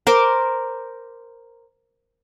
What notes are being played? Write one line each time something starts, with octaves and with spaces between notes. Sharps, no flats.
A#4 C5 C6 D6